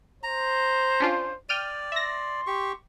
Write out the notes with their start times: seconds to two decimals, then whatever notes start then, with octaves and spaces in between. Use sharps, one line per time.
0.23 C5 A#5
1.00 C#4 D4 F4
1.49 D5 G5 F6 D#7
1.92 E5 C6 A#6
2.47 G4 C#6